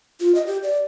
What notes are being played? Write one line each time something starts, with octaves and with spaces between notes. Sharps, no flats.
F4
D#5
G4
D5